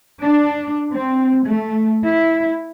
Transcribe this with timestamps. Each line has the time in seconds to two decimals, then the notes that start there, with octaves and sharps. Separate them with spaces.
0.23 D4
0.92 C4
1.47 A3
2.05 E4